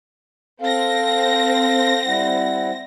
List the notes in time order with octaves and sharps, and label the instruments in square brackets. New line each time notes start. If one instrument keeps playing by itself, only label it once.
[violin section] C4 A#6 [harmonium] A4 F5
[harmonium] G3 E4 F#5